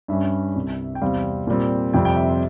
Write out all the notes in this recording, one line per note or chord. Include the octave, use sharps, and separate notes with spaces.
G2 G3 C#4 E5
C2 C3 G3
G5
E2 C3 G3 C4 F5
A#2 G3 C4
F2 C3 G3 C4 G5
G5
E5
C5